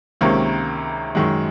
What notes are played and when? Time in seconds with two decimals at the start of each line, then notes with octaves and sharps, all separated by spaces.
0.21 C#2 C3 D#3 A#3 C#4
1.15 F#2 D#3 G#3